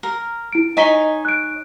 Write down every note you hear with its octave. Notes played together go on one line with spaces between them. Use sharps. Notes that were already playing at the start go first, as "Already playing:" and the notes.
A#4
E4 D7
D#4 C#5 D#5 G#5 B6 G7
F#6 D7